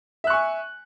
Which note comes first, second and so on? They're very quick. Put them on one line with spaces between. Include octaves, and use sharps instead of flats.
E5 F#6 C#6 G#5